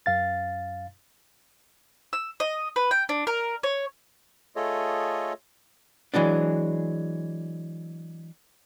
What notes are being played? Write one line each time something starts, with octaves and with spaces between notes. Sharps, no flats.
F#2 F5 A6
E6
D#5
B4
G5
D4
A#4
C#5
A3 F4 G#4 A4 C#5 D#5
E3 F#3 G#3 D4